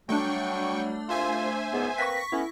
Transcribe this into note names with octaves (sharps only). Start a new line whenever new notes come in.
F#3 G3 A3 D4 G5 C#6
C2 F4 C5 E5 G#5 C6
C#2 G#2 B3
A#3 C4 B4 C#6 A#6 B6
A3 B3 C#4 E4